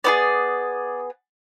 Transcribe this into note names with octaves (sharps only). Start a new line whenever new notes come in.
B3 E4 G#4 D5